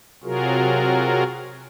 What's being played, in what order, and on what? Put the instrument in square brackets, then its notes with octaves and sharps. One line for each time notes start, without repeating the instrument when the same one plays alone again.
[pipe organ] C3 F#3 F4 F#4 G#4 A#4